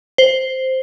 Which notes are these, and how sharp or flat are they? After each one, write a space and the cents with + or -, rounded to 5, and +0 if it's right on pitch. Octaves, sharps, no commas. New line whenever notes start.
C5 +0